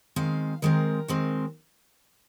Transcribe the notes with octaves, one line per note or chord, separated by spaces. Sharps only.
D#3 G#3 C4 F5
D#3 G#3 C4 A#4
D#3 G#3 C4